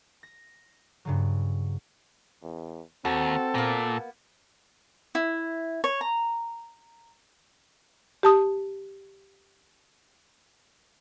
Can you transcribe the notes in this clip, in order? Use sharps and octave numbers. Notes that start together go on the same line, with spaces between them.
A#6
G2 C#3 F#3
E2
D#2 C4 F#4 A4
A#2 A#3 B3
E4
C#5
A#5
G4 A5 D#6